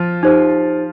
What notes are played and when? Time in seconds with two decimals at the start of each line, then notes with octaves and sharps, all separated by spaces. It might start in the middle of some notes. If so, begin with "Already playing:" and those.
Already playing: F3 F4
0.23 D#4 G4 C5